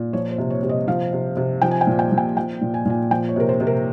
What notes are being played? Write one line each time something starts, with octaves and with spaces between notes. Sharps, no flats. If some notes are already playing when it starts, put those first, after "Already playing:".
Already playing: A#2
F3 C#5
C5
C3
C#5
C3
D#5
F3 F5
C3
C3
F3 G5
G#5
G5
A#2
G5
A#2
G5
F3 G5
A#2
G#5
A#2 G#5
F3 G5
C#5
C3 A#4
C5
C3
A#4